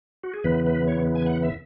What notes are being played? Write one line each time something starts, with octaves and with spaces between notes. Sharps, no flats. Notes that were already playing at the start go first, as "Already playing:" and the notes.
F#4
G#4
E2 C#3 E3 B3 B4
B4
C#5
G#5
F#5
E5